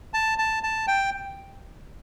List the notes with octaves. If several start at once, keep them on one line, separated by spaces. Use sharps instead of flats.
A5
A5
A5
G5